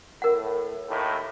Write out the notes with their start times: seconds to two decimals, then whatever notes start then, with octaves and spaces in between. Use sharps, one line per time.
0.22 A2 A#4 F#5
0.89 D#2 A2